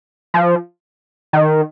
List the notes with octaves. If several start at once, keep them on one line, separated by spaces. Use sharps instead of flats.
F3
D#3